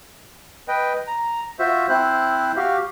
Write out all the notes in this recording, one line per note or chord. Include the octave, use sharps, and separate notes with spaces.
B4 D#5 G5
A#5
F4 F#4 C5 E5
C4 E4 C5 F#6
F#4 G4 F5